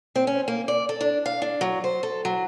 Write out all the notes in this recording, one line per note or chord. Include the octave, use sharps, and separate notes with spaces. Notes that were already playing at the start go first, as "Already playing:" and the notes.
C4
C#4
A#3
D5
A4
D4
F5
D4
F#3
C5
A4
F#3